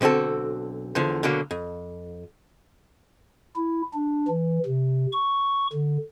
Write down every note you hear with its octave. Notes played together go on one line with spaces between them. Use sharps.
B1 D3 C4 F#4 A4
E2 D3 F3
B2 D3 F#3 A#3
F2
E4
D4
E3
C3
C#6
D3